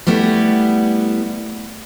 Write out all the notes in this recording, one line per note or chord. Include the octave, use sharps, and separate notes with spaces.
G3 A3 B3 E4